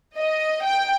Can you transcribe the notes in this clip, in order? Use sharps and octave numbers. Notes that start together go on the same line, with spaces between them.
D#5
G5